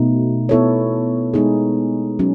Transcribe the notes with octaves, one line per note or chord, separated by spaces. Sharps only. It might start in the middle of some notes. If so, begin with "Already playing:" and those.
Already playing: B2 A3 D#4
B3 E4 A4 C#5
G#3 B3 D#4 G#4
F#3 C#4